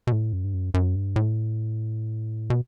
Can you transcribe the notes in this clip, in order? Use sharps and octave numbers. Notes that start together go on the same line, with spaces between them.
B2
A2
F#2
G2
F#2
F#2
G2
A2
B2